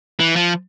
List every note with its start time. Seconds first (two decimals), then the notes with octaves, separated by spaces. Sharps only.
0.20 E3
0.36 F3